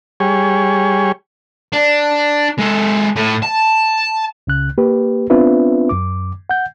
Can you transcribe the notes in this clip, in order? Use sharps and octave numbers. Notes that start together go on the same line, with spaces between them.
G3 G#4 C#5
D4
G#3 A4
A2
A5
C#2 C#3 F#6
A#3 G4 B4
B3 C4 D4 F4 B4 E5
F#2 D6
F#5 G6